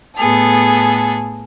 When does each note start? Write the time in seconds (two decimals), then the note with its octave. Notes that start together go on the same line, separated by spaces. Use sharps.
0.16 A2 B3 G#4 A4